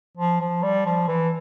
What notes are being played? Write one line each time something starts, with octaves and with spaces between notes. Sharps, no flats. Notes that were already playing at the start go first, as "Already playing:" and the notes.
F3
F3
G3
F3
E3